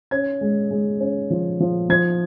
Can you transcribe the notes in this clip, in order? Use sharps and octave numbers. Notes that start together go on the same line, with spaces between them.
C#4 G#6
G#3
G#3
C#4
F3
F3
F3 G#6